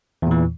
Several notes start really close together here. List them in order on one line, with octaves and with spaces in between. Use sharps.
E2 A#2 E3